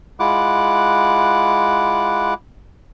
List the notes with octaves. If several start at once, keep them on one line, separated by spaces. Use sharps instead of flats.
G#3 E4 F4 F#5 D6 F#6